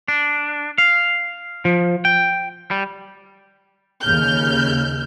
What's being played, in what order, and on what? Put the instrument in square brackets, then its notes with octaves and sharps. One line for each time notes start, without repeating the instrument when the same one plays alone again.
[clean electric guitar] D4
F5
F3
G5
G3
[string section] D#2 C#3 F6 G6